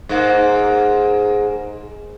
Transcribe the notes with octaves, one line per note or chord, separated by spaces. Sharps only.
G#2 A#3